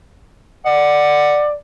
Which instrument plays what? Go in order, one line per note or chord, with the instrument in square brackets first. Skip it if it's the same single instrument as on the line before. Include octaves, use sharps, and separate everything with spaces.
[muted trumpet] D5 [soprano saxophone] F#5